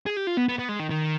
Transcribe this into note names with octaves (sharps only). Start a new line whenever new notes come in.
G#4
G4
F4
B3
B3
B3
G#3
D#3
D#3